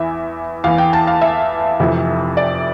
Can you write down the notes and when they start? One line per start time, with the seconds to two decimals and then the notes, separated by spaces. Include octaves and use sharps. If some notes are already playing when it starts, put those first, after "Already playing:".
Already playing: E2 E3 E5
0.64 E2 E3 F5
0.78 G5
0.93 A5
1.07 F5
1.22 E5
1.79 F1 F2 C3 E3
2.37 D5